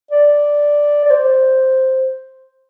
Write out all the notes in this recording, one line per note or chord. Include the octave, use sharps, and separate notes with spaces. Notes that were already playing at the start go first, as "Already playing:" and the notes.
D5
D5
C5